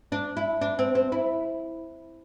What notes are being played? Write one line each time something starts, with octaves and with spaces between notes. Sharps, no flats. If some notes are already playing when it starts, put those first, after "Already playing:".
D4
E4
D4
C4
C4
E4